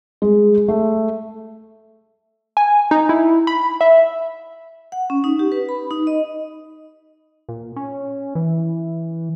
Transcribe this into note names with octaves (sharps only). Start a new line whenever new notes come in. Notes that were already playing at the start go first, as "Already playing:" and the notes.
G#3
A3
G#5
D#4
E4
B5
E5
F#5
C#4
D#4
G4
B4
B5
D#4
D#5
A#2
C#4
E3